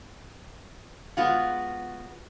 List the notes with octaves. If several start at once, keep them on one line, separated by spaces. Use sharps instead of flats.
G#3 B3 F4 F#4